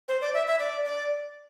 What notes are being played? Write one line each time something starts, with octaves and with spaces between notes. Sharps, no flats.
C5
D5
E5
E5
D5
D5